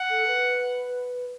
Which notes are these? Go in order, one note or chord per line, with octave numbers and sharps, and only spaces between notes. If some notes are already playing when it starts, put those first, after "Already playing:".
Already playing: F#5
A4
B4